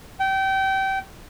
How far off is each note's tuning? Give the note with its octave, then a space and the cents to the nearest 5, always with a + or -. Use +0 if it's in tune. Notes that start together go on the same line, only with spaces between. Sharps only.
G5 -25